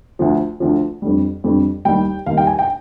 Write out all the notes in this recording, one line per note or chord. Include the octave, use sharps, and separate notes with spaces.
D2 D3 F3
D2 D3 F3
F2 D3 G3
F2 D3 G3
D#2 D#3 G3 G5
D#2 D#3 G3 F5
G5
G#5
G5